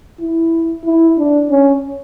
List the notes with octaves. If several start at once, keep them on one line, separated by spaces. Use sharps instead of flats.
E4
E4
D4
C#4